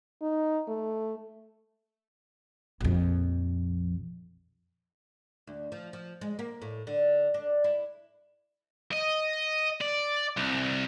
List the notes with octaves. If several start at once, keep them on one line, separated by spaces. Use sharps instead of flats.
D#4
A3
A#1 F2
D2
F3
F3
G#3
A#3
A2
D3
D4
E4
D#5
D5
C2